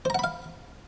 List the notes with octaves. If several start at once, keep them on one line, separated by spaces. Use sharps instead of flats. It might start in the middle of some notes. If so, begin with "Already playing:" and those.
C5 F5 F#5 A#5 B5